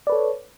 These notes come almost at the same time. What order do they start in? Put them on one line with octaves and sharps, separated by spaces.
D5 B4 A4 C#5